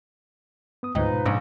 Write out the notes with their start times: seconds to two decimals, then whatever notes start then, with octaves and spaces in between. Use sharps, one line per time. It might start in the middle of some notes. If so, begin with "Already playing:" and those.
0.83 B3 D#6
0.95 D2 G#2 F3 D#4 B4 D#5 G5
1.11 B2
1.26 A#1 G#2